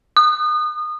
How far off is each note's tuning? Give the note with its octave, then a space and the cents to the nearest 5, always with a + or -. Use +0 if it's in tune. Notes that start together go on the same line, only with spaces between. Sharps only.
D#6 -30